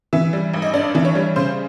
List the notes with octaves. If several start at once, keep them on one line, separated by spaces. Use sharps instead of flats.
E3 E5
G3
G#1
D#5
G2 D5
E3
C#5
G3
C#3 C5